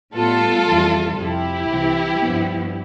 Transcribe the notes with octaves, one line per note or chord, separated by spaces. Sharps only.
A2 G3 B3 F4 A4
F2 E3 G3
F2 C3 F3 E4 G4
C2 C3 E3
G2 F3 B3